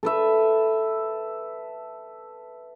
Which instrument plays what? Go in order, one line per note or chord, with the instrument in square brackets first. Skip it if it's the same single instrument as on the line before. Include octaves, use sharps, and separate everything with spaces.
[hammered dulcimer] A4 B4 E5